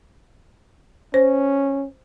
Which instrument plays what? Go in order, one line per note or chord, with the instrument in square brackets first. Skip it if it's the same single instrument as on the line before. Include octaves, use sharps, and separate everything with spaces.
[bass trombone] C#4 [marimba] C5